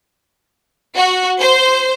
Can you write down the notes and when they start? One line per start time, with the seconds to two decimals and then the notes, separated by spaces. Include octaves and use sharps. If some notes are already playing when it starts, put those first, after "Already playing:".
0.96 F#4
1.40 C5